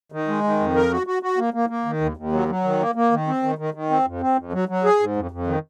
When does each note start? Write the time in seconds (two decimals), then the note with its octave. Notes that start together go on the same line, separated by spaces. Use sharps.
0.12 D#3
0.28 G#3
0.44 D#3
0.60 F2
0.75 A#4
0.91 F#4
1.07 F#4
1.23 F#4
1.38 A#3
1.54 A#3
1.70 A#3
1.86 D#3
2.01 D#2
2.17 D#2
2.32 F#3
2.49 F#3
2.64 D#3
2.80 A#3
2.95 A#3
3.11 D#3
3.27 C4
3.43 D#3
3.58 D#3
3.74 D#3
3.90 C4
4.06 F2
4.21 C4
4.37 F2
4.53 F#3
4.69 F#3
4.84 G#4
5.00 G#2
5.16 F2
5.31 F2
5.47 D#3